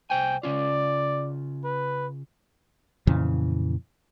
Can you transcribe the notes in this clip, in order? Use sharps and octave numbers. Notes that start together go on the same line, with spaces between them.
C2 C5 G5 G#5
C#3 C#4 F4 D5
B4
F2 A#2 C#3 E3